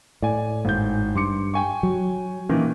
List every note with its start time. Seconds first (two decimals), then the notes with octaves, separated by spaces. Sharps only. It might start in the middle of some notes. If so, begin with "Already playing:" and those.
0.22 A2 D5 G#5
0.65 G#1 G6
1.16 G2 C6 D6 C#7
1.54 G5 G#5 C#6
1.83 F#3
2.49 A#2 D#3 E3 C#4